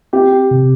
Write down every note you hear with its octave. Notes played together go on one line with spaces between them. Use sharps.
C4 G4
C3